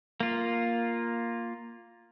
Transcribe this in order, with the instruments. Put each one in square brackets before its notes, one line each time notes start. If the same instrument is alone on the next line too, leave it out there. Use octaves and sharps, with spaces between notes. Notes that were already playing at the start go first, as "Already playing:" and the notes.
[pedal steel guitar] A#3 F4